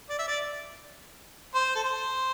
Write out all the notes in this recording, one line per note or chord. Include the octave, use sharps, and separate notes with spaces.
D5
E5
D5
C5
A4
C5